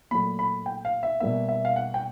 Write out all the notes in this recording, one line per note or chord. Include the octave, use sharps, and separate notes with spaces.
A#2 F#3 A3 B5
B5
G5
F5
E5
B2 G3 A#3 E5
E5
F5
F#5
G5